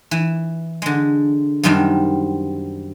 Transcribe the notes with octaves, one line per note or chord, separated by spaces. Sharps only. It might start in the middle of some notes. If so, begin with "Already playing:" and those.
E3
D3 G#3
F#2 C3 D#3 G3 D4